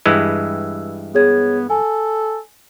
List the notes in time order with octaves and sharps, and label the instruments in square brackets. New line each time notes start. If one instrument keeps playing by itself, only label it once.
[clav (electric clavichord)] G2 E3 G#3 [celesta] E6
[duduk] B3 [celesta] G#4 C#5 G#6
[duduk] A4 [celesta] G#5